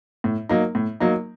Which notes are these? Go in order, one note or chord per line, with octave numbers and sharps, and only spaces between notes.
A2
F#3 A#3 D#4
A2
F#3 A#3 D#4